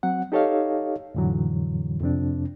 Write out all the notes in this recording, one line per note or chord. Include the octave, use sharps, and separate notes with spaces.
F#3 C4 F#5
D#4 G4 A4 C#5 D#5 F5
F2 A2 D3 E3 F#3
F2 C3 C4 D4